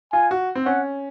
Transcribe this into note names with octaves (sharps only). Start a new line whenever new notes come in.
F4 G#5
F#4
C4
C#4 F#5